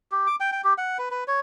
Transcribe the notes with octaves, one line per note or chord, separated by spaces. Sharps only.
G4
D6
G5
G5
G4
F#5
B4
B4
C#5